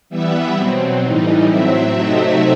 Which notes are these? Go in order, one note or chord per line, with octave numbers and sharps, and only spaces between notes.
E3 G3 B3 E5
B2 F#3 C4
A2 E3 G3 D#4
A2 F#3 C4 E5
C3 F#3 A3 C4 D#4 E5